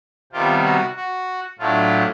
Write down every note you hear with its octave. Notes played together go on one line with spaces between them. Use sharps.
C3 D#3 G3 B3 F4 G4
F#4
F#4
A2 F#3 A3 D4 F4